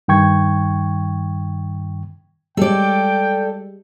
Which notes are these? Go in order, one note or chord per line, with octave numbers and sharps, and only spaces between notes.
G2 D#3 G5 C#6 G#6
G3 G#3 A4 D5 G5